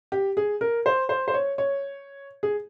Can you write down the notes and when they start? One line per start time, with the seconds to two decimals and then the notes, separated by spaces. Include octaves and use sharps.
0.12 G4
0.37 G#4
0.61 A#4
0.86 C5
1.09 C5
1.28 C5
1.34 C#5
1.58 C#5
2.43 G#4